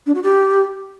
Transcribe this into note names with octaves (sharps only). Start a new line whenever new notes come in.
D4
F#4
G4